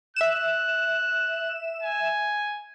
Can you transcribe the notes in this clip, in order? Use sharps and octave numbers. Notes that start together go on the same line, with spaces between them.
E5 F#6 E7
G#5